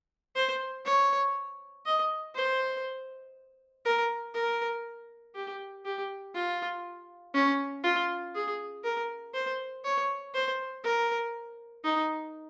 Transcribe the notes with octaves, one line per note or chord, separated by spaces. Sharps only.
C5
C#5
D#5
C5
A#4
A#4
G4
G4
F4
C#4
F4
G#4
A#4
C5
C#5
C5
A#4
D#4